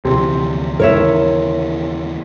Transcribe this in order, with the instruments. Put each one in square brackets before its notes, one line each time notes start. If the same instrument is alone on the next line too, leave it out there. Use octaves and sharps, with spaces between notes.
[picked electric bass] D2 E3 F3 [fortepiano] C3
[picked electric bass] D#2 C#3 E3 [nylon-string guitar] A#4 C#5 E5